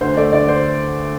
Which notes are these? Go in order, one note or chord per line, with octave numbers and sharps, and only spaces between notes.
D2 C5
A3 D5
D3 D5
C5